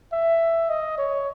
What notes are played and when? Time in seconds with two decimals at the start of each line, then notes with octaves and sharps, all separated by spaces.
0.13 E5
0.69 D#5
0.98 C#5